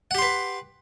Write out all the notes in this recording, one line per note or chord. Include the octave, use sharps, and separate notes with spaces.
G4 B4 F#5 C6